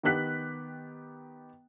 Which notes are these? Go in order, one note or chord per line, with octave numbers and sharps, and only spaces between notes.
D#3 B3 G4 F#6 B6